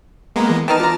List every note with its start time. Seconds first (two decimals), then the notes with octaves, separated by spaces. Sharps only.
0.36 G#3 A#3 B3 A#5
0.50 E3
0.68 D#3 D#4 B4 A5 F6
0.80 D3 F4 A#5